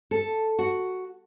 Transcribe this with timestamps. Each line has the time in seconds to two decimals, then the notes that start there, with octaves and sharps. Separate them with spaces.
0.11 A4
0.59 F#4